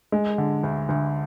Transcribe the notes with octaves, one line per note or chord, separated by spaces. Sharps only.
G#3
D3
D2
D2